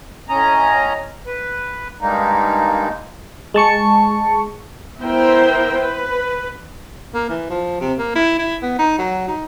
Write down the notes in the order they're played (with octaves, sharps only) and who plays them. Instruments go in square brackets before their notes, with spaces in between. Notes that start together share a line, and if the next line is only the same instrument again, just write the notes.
[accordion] A2 C#4 D#5 A#5
B4
G2 G3 G#3 A#3 D#4
[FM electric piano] G#3 A5 C#6 C#7
[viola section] B3 E4 A#4 C5 G5
B4
[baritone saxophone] A#3
E3
F3
C3
A#3
E4
E4
B3
D#4
F#3
D#4